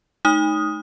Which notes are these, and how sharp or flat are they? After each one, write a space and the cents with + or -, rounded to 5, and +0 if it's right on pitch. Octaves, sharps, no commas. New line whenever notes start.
A3 -35 D#4 +0 D#6 +0